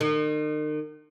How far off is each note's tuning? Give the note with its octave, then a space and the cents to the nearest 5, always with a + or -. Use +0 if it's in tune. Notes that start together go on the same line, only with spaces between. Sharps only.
D#3 -40